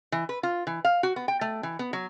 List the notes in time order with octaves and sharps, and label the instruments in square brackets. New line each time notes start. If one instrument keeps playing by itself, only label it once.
[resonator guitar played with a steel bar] E3
B4
F4
E3
F5
F#4
B3
G5
A3
E3
B3
F#3